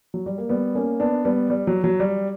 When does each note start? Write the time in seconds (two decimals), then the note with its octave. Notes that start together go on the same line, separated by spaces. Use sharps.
0.14 F#3
0.26 G3
0.38 A#3
0.49 G3 B3
0.75 A#3 C#4
1.00 B3 D4
1.25 G3 B3
1.50 G3
1.67 F#3
1.84 F#3
2.00 G3